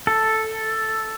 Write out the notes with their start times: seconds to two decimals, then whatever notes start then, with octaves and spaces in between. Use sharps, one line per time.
0.07 A4